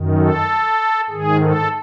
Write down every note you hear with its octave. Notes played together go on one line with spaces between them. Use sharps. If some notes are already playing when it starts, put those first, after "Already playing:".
Already playing: F#2 D#3
A4
G#2 D#3 G#4
A4